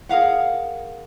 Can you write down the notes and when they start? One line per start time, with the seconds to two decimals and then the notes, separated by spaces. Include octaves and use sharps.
0.09 G#4 A#4 F5 F#5